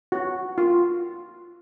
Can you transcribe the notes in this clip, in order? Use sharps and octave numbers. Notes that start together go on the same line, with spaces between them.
F#4
F4